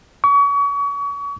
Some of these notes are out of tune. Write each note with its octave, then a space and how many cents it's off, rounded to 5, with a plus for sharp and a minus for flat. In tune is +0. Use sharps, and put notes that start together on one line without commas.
C#6 +35